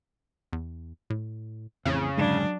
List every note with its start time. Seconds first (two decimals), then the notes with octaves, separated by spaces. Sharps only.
0.53 E2
1.10 A2
1.85 A1 F2 C#3 E3 C4
2.17 G#2 D3 F#3 G#3 D4